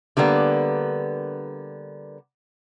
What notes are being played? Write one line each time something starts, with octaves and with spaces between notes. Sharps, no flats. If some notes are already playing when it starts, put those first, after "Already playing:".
D3 G3 A#3 B3 D5